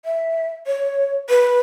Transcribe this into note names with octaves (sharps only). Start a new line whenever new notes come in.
E5
C#5
B4